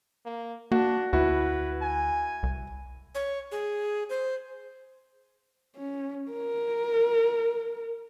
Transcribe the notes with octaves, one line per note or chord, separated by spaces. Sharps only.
A#3
A#3 D4 F#4
D2 E4 F#4 B4
G#5
C2
C#5
G#4
C5
C#4
A#4